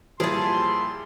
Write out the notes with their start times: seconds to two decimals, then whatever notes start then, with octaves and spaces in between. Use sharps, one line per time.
0.20 A#2 F3 G3 E4 G#4 A5 C6